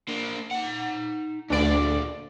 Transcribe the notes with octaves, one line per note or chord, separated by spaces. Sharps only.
A#3 D4
D#4 F#5
D2 A#2 D4 D5